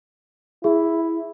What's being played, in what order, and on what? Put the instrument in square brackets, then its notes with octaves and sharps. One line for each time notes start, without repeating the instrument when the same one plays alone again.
[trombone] E4 [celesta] G#4